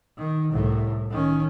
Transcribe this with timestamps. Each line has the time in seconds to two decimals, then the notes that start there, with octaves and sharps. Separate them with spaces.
0.18 D#3
0.52 C2 A2
1.11 D#3 C#4